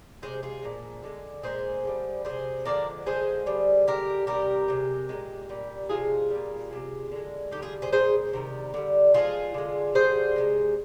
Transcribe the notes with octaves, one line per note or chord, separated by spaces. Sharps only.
C3 F3 G#3 G#4 C5
F4 G#4
A#2 F3 G#3
D3 G#3
A#2 G#3 G#4 C5
D3 G3
C3 G3 G#4 C5
D3 F3 G#3 A#4 D5
D3 F3 G#3 G#4 C5
D3 G3
D3 G#3 G4 A#4
C3 D#3 G3 G4 A#4
C3 F3 G#3
A#2 F3 G#3
A#2 G3
C3 F3 G#3 F4 G#4
A#2 G3
C3 F3 G#3
D3 G#3
D3 G3 D#4 G4
F4 G#4
G#4 C5
A#2 G#3 G#4 C5
C3 D#3 G3
D3 G3
D3 F3 G#3 F4 G#4
D3 G#3
D3 G3 G#4 C5
C3 F3 G#3